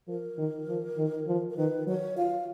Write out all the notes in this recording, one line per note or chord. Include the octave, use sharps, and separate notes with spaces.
F3 A#4
D#3
F3
D#3
F3
A#4
D#3 B4
F#3 C#5
F4 F5